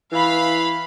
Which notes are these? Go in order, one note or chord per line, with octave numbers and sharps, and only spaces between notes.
E3 F5 B5